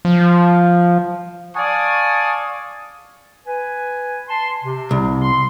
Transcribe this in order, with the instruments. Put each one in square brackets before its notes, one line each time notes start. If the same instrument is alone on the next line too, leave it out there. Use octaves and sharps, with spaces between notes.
[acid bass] F3
[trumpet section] D5 F5 G#5 A5 C#6 D#6
[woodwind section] B4 G#5
A5 C6
C3
[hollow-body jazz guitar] C2
[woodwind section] C6